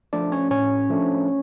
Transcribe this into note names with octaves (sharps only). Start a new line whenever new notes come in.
F3 A3 D4 D5
C#4 C#5
A2 C#4 C#5
F3 A3 D4